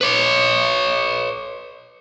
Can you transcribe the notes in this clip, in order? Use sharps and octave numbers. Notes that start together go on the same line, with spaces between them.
B4 C#5